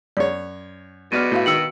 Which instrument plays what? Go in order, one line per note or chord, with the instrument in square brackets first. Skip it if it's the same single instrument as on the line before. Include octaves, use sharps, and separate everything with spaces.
[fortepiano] F#2 C#5 [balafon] D5
[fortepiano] B1 D5 F6 [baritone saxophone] B2 [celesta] D6 D#7
[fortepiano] A2 [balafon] F#4 E5 F5
[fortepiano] D#3 [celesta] E6 C#7 F#7